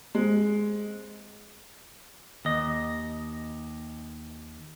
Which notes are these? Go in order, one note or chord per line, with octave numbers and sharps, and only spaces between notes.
G#3 C4
D#2 D#5